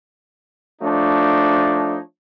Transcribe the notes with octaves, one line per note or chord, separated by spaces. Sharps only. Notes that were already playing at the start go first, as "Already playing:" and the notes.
F3 A3 D4 D#4 C#5